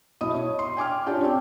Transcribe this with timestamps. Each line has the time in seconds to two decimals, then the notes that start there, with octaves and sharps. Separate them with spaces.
0.21 B1 E4 D#5 D#6
0.34 C#5
0.59 C6
0.77 G5 G#5 D6 F6
1.06 D4 F4 G4 C#5 D5
1.24 C4 C#4 G5